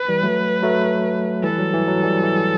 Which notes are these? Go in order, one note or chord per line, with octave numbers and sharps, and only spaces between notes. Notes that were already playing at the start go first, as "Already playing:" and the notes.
Already playing: B4
E3 G3
F#3 A3
F#3 A3
E3 G3 A4
F#3
E3
F#3
E3 G3
E3